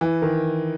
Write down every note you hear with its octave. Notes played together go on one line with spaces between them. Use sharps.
E3
D#3